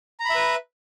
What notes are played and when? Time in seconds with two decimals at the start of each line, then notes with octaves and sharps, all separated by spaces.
0.20 A#5
0.25 B5
0.30 E5
0.35 B4